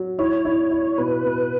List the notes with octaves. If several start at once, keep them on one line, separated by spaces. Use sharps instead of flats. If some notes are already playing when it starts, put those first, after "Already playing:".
Already playing: F#3
E4 C#5
E4
E4
B2 B4
B2